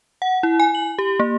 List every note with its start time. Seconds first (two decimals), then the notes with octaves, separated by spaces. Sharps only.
0.22 F#5
0.43 E4
0.60 G#5
0.75 F#7
0.99 G4
1.20 A#3